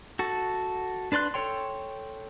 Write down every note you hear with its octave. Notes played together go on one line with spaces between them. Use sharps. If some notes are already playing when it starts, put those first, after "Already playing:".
F#4 A4
D4 B4 D5 C6 F#6
A4 C#5 G5 C6